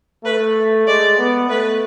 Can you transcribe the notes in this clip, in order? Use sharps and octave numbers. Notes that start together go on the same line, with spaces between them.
A3 B4
G#3 D5
B3
A3 B4